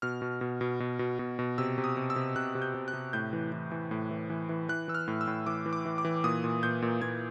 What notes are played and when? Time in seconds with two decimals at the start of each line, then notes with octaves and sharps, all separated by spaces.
0.02 B2 F6
0.22 B2
0.41 B2
0.61 B2
0.80 B2
0.99 B2
1.19 B2
1.39 B2
1.58 C3 E6
1.78 C3
1.84 D#6
1.97 C3
2.10 E6
2.16 C3
2.36 C3 F#6
2.55 C3
2.62 G6
2.75 C3
2.88 F#6
2.94 C3
3.13 A2 G6
3.33 E3
3.52 E3
3.72 E3
3.91 A2
4.11 E3
4.30 E3
4.49 E3
4.69 E3 F#6
4.88 E3 E6
4.95 F6
5.08 A2
5.21 E6
5.27 A2
5.46 E3 D6
5.66 E3
5.73 D6
5.86 E3
5.98 D6
6.05 E3
6.24 A#2 D#6
6.44 A#2
6.63 A#2 G6
6.82 A#2
7.02 A#2 G#6